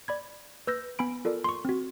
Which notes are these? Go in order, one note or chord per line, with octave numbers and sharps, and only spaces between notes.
D5 B5 G#6
B4 E6 G6 A#6
B3 G#5 B5 D7
F4 A4 A#4 D5
C6 C#6
C4 F#4